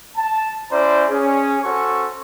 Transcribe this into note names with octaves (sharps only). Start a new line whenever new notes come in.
A5
C#4 E4 C5 D5 A#5 C6
C#4 G#4
C#4 F#4 A4 C5 C#6